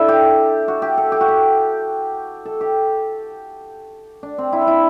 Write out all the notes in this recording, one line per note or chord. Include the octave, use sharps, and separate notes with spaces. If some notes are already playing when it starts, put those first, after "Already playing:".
Already playing: D4 E4 A4
G4
F#4
G4
A4
G4
F#4
G4
A4
G4
D4
C4
E4
D4
E4